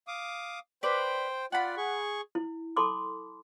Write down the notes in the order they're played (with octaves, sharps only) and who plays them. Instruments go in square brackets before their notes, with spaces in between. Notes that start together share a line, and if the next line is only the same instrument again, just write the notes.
[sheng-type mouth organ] F5 D6 D#6
[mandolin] B4 D5 [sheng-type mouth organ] C5 G5
[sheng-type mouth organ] F4 D5 [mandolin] F#5 B5
[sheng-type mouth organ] G#4 C#6
[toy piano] E4
A4 A5 B5 C6 D6